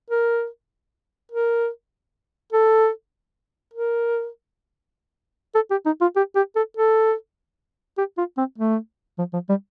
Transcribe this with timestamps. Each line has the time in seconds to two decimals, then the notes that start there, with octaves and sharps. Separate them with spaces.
0.10 A#4
1.32 A#4
2.52 A4
3.74 A#4
5.55 A4
5.71 G4
5.86 D#4
6.01 F4
6.16 G4
6.36 G4
6.56 A4
6.77 A4
7.98 G4
8.18 F4
8.38 C4
8.58 A3
9.18 F3
9.34 F3
9.49 G3